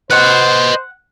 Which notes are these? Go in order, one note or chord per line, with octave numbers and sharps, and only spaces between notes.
B4 C5 D#5 F#5